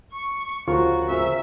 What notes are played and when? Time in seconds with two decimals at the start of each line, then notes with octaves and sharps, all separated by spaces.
0.12 C#6
0.68 D2 C#3 F3 F4 F#4 A#4 C#6
1.10 C#3 F3 A#4 E5